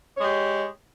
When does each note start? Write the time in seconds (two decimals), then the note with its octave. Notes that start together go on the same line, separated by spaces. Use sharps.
0.16 C#5
0.19 G#3
0.22 G4